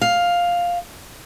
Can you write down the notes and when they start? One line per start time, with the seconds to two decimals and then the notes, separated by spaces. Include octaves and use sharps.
0.01 F5